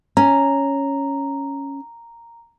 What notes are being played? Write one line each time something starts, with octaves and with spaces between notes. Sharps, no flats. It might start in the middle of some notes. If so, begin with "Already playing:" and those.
C#4 A#5